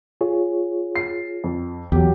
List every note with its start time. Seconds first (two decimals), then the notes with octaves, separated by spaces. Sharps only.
0.21 F4 G#4 C#5
0.96 C7
1.44 F2
1.92 E2 F#3 G4